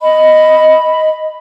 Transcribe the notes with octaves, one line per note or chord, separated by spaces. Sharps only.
D#5 B5